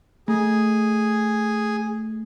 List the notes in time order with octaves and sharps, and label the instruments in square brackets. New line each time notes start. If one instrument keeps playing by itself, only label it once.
[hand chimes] A3 [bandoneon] G#4